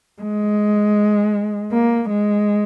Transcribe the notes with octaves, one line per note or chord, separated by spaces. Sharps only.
G#3
A#3
G#3